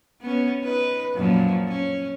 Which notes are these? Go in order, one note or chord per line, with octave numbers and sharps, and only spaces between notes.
B3 C#4
D#4 B4
F#2 A#2 F3
C#4